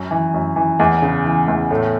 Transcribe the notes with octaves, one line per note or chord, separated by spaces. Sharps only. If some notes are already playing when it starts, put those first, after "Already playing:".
Already playing: F#2
E3
F#2
E3
E2
C#3
E3
E2
A2 A3